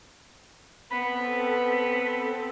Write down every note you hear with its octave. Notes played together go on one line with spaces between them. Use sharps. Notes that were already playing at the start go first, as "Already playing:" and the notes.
B3 C4 A4 B4 B5 B6